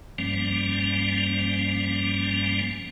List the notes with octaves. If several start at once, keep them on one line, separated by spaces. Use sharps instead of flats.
G2 F3 G3 A#3 C#4